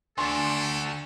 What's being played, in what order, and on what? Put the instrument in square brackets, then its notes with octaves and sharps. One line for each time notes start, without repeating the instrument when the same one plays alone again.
[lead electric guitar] D2 [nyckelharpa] D4 [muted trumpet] A4 [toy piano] G#5 C6